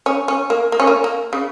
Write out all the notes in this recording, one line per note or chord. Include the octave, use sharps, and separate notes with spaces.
C#4
C#4
A#3
A#3
C#4
A#3
A#3
C#3